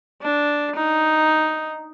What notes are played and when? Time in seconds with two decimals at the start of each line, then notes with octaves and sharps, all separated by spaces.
0.22 D4
0.75 D#4